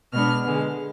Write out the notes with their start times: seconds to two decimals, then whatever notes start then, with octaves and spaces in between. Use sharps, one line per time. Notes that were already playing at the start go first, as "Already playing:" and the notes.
0.13 B2 G#3 B3 D4 F6
0.44 D3 G#3 B3